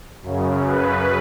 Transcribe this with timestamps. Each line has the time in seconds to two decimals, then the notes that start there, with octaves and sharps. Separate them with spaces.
0.22 F#2 C#3
0.65 B4